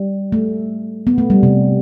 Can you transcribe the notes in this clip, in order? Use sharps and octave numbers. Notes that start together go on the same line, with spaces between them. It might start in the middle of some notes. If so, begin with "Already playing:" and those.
Already playing: G3
A3
B3
A3
G3
C3